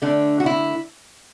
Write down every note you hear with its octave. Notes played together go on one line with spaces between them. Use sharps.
D3 A3 D4
F#4
E4